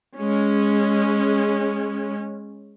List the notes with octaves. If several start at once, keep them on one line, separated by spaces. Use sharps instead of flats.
G#3 C#4